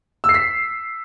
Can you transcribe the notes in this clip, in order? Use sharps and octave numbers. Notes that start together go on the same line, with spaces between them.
E6
C7
B6